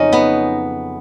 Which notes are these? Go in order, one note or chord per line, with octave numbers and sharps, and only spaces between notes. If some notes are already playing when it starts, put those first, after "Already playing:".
Already playing: F2 C#3 F#3 C#4 D#4
B3